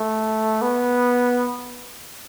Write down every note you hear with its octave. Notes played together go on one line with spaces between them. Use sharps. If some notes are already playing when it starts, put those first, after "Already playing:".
Already playing: A3
B3